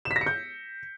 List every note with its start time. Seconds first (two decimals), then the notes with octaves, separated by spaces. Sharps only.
0.05 E7
0.11 B6
0.16 A#6
0.21 C#7
0.26 G6